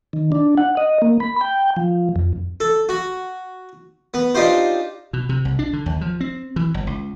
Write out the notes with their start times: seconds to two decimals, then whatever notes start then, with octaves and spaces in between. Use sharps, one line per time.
0.13 D#3
0.32 D4
0.58 F#5
0.77 D#5
1.02 A#3
1.20 B5
1.41 G5
1.76 F3
2.16 F2
2.60 A4
2.89 F#4
4.14 B3
4.35 D4 D#4 F4 G4 C5
5.13 B2
5.29 C3
5.45 C2
5.59 D4
5.73 D3
5.86 D#2
6.01 F3
6.20 C4
6.56 E3
6.74 G1
6.87 C#2